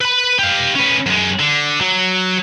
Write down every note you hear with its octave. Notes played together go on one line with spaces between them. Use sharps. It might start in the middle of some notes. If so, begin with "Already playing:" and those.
B4 B5
G4 F5
C#4 B4
F#2 G#3
D3
F#3